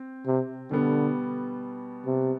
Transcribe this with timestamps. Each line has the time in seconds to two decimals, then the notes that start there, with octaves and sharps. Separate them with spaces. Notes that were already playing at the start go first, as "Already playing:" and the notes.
Already playing: C4
0.26 C3
0.70 B2 D3 G3 B3
2.06 C3